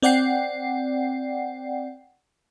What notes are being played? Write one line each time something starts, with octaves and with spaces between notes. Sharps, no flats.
C4 D5 F#5 G5 C7